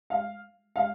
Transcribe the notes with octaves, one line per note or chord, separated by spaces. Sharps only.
F5
F5